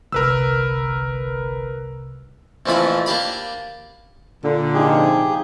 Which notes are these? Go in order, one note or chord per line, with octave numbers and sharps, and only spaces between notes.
G1 C2 A#4 B4 E6
A#1 F2 E3 F3 A3 B5
A#3 D4 G4 B5
A#2 D3
C3 F3 D#4 G4 G#4